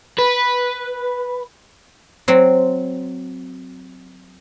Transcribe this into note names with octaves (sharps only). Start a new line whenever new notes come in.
B4
F#3 C4